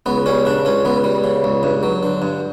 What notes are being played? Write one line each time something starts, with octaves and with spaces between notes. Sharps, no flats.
C#2 B3
G3 C#4
C#3 D4
C#2 C#4
C#2 B3
G3
C#3
C#2
G2
F#3
D3
G2